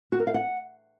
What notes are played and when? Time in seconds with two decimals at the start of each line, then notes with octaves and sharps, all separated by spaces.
0.12 F#4
0.20 A#4
0.27 F5
0.34 F#5